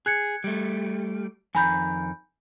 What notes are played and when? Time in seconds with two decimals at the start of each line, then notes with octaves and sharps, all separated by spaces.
0.06 G#4 F#6 G#6 C#7
0.44 G3 A3
1.55 F2 D#3 G#5 A#5 B5 G6